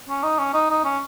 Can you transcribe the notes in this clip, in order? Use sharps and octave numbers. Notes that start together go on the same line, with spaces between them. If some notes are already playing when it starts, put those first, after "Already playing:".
C#4
D#4
C#4
D#4
D#4
C#4